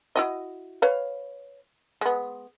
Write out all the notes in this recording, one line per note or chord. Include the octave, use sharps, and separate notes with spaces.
E4 F#4 D#5
B4 C#5 F5
G#3 B3